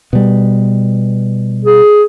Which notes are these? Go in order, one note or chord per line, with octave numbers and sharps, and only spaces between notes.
B2 G3
G#4